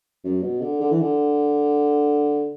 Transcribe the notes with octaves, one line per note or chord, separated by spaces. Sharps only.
F#2
B2
D3
D3
E3
D3